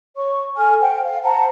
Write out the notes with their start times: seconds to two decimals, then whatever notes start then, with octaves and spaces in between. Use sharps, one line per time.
0.16 C#5 C#6
0.57 A4 G#5 F6
0.80 C5 F#5 G5
1.04 F5
1.24 C5 F#5 A5 A#5